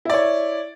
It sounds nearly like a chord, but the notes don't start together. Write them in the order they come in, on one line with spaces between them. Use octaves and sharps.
E4 D5 C#5